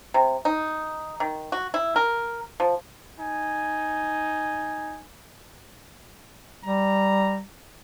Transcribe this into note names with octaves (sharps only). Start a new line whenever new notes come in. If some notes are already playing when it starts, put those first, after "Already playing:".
C3
D#4
D#3
F#4
E4
A#4
F3
D#4 G#5
G3 A#5